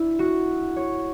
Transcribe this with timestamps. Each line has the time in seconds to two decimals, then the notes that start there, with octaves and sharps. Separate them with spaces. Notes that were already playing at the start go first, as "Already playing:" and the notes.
Already playing: D4 E4
0.19 F#4
0.76 C#5